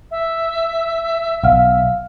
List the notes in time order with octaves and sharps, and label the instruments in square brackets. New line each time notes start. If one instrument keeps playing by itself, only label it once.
[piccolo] E5
[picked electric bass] B1 [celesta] F5 F#5 F6